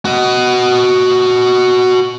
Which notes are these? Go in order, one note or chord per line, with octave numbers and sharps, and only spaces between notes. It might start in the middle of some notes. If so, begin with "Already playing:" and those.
F#4 D#5